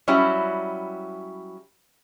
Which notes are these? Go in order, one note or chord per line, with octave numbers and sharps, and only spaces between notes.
F#3 G3 C#4 E4